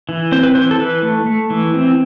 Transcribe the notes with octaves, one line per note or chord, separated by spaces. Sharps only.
E3
C4 C5
B4
E3 C5
A4
E3 B4
A3
A3
E3
C4